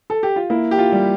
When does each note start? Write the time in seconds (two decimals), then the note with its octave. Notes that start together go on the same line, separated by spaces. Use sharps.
0.10 A4
0.23 G4
0.36 F4
0.50 A#3 E4
0.71 G4
0.78 F4
0.92 G3